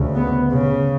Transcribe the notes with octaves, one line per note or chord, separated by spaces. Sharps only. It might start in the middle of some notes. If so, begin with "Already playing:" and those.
Already playing: D2 C#3
B3
C#3